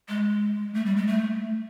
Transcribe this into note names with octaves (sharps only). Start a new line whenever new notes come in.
G#3
A3
G3
G#3
A3